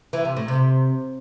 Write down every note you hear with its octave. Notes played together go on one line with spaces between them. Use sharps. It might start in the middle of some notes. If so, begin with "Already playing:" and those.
E3
C3
A2
C3